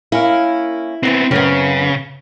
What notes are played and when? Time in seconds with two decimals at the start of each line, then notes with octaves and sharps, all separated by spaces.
0.12 A#3 C#4 E4 A#4
1.03 B2 D#3 E3 B3 C4
1.31 F#2 C#3 B3 C4 A#4